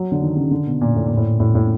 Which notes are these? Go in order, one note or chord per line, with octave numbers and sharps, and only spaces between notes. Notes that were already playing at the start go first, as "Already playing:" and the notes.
Already playing: F#3
D3
D#3
C#3
D3
B2
A#2
A2
A#2
A2
A2
A2